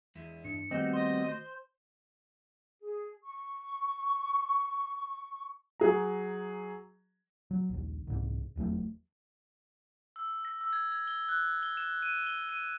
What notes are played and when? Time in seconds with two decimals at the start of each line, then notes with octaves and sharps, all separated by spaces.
0.15 E2 G#3 E4
0.44 G2 C#7
0.71 D#3 G3 A3 B3 C4 F#4 D#5
0.93 D#5 C6
1.28 C5
2.80 G#4
3.23 C#6
5.80 F#3 G#4 A#5
7.51 F#3
7.70 A#1 D#2
8.07 C2 G#2
8.56 F1 E2 F#3 A3
10.16 E6
10.45 A#6
10.61 E6
10.73 G#6
10.92 G#6
11.08 G7
11.29 F#6
11.63 G7
11.77 E7
12.02 D#7
12.27 G7
12.49 D#7